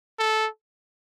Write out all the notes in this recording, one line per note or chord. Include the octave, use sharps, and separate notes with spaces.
A4